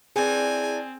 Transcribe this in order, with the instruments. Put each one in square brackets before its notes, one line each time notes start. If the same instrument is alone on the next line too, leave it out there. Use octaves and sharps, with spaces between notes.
[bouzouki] E3 D4 [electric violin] C4 [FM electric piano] G#4 [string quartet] G#5